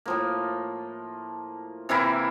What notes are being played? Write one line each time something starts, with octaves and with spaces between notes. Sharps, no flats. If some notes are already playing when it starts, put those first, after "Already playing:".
A2 F3 A#3
C3 E3 A#3 E4